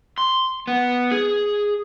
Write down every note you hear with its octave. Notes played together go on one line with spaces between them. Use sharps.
C6
B3
G#4